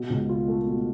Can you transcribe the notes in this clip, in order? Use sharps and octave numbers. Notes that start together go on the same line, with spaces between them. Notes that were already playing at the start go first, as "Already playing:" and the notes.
Already playing: B2
C#2
F4
A3
B2